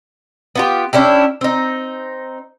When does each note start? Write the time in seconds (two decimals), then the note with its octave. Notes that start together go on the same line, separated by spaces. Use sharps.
0.55 B3 F4 G4
0.93 C#4 D4 E4 G4
1.41 C4 D#4